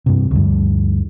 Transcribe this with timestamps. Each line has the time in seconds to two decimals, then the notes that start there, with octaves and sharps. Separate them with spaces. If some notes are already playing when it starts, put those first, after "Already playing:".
0.06 G2 C3
0.31 D2 G2